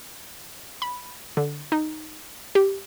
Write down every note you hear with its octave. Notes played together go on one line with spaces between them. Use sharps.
B5
D3
D#4
G4